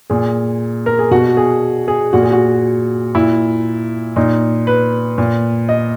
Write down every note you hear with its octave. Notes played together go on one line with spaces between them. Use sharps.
A#2 G#4
A#4
G#4
B2 F#4
G#4
G#4
A#2 F#4
G#4
F#4
A#2 E4
A#2 D#4
B4
A#2
D#5